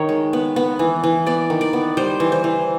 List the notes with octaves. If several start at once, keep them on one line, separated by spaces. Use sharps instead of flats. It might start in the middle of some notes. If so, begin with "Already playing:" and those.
Already playing: D#3 C#5
G#3
B3
B3
E3
E3
B3 D5
D#3
D5
B3
G3 C5
E3
C5
E3